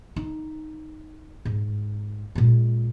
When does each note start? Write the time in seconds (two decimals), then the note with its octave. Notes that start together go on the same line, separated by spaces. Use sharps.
0.16 D#4
1.45 G#2
2.35 A#2 G#3